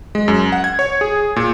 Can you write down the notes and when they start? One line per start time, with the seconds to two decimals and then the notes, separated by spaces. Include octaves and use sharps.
0.15 G#3
0.28 F#2
0.52 F#5
0.64 G#6
0.79 C#5
1.01 G#4
1.36 A#2